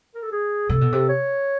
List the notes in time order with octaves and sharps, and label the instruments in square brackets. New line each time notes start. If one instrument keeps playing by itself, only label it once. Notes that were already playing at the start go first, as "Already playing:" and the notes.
[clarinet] A#4
A4
G#4
[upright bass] C3 [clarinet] A4
[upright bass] B2
C3
[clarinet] C#5